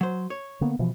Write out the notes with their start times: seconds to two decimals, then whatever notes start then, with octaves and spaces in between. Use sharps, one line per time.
0.01 F#3 C5
0.30 C#5
0.61 D3 A#3 B3
0.79 B2 E3 F3